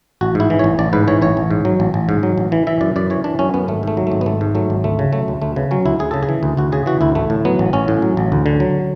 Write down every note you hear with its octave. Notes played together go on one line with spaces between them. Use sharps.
A1 F#4
G#2 E4
E3
A1 C#5
A1 D5
G#2 B4
E3 C#5
A1 C#5
A1
G#2
F#3
A1
A1
G#2
F#3
A1
E3
E3 E5
F#2 D5
F#2 D5
E3 C#5
E3 D4
F#2 C#4
F#2 B3
G#1 A3
G#2 A3
F#3
G#1 A3
B3
G#1 A3
G#2
F#3 A3
G#1
D2 A3
C#3
F#3 A3
D2
D2 A3
C#3 B3
F#3 C#4
D2 E4
D2 G#4
C#3 A4
G#4
E3
D2
D2 F#4
C#3 G#4
E3 F#4
D2 E4
A1 A3
A2
F#3 B3
A1
A1 C#4
A2
F#3
A1
D2
D3
F#3